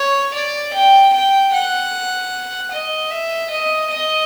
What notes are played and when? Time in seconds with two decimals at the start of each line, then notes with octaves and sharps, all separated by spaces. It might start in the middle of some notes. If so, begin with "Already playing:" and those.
Already playing: C#5
0.34 D5
0.73 G5
1.13 G5
1.53 F#5
2.71 D#5
3.11 E5
3.50 D#5
3.90 D#5